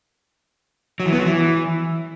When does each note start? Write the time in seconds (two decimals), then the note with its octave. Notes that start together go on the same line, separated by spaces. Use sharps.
1.00 F#3
1.06 E3
1.12 B3
1.19 F#3
1.25 E3